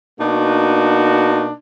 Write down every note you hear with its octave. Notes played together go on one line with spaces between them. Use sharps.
B2 A#3 D4 D#4 F#4